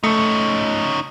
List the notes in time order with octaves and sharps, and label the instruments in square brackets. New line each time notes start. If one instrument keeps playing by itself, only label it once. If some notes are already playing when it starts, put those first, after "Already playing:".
[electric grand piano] A3 C#7 [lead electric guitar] C#4 D#4